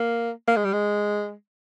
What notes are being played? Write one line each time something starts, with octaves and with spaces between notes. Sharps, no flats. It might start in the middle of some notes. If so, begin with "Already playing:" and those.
Already playing: A#3
A#3
G#3
G3
G#3